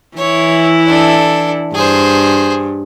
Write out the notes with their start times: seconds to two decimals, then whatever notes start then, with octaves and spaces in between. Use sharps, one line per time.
0.17 E3 E4 C#5
0.87 D4 A4
1.74 G2 G#4 C5